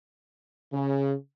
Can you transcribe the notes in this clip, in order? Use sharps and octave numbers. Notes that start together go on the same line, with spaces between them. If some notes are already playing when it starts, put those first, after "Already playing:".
C#3